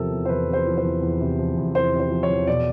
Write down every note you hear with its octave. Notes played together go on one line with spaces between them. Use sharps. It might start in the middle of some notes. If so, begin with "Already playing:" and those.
Already playing: E2 C3 F3 A4 A#4
E2
C5
E2 B4
C3 C5
F3
C5
E2
E2
C3
F3
E2
E2 C5
C3
C5
F3
C#5
E2
B2 D5